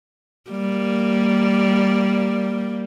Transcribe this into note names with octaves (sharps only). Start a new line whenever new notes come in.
G3 A#3